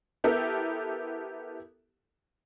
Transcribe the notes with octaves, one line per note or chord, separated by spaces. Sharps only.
B3 E4 G4 A4 A#4